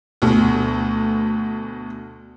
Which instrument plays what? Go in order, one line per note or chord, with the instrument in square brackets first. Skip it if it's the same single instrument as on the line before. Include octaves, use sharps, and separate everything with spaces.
[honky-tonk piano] D2 B2